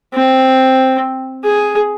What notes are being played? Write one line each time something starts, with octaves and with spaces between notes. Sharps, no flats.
C4
G#4